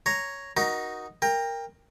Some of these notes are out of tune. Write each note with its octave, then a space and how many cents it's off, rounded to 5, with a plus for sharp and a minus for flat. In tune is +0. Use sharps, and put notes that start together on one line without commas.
C#5 +0 A#5 +0
D#4 +0 F#4 +0 A#4 +20
A#4 -5 G5 +25